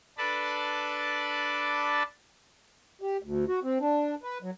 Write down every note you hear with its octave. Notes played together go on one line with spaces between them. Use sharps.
D4 A4 B4 D5 A5 B5
G4
D2
F#4
C4
D4
B4
F#3